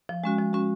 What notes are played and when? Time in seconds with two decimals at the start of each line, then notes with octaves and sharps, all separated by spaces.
0.09 F3
0.24 G#3 C#4 F#4
0.38 F3
0.53 G#3 C#4 F#4